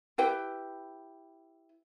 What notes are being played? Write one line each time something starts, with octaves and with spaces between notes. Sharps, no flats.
E4 G4 B4 G5